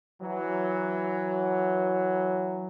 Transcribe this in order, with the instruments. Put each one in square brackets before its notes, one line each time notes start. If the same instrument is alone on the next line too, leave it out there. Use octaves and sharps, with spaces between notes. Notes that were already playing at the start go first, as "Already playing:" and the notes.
[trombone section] E3 F#3